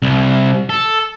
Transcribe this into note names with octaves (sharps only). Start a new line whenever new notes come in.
C2
A4